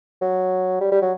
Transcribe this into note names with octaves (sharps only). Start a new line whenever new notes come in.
F#3
G3
G3
F#3